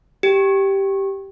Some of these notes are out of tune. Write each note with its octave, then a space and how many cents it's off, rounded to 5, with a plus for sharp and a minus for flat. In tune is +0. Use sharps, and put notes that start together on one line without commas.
G4 -5